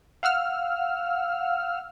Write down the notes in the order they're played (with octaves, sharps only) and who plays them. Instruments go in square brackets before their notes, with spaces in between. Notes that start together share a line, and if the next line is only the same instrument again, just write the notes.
[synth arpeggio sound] F5 F#5 E6 F6